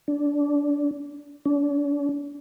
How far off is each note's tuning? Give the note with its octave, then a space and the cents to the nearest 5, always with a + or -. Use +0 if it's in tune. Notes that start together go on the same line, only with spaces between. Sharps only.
D4 -20
D4 -40